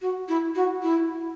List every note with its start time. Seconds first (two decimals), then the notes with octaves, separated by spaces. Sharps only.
0.01 F#4
0.28 E4
0.55 F#4
0.82 E4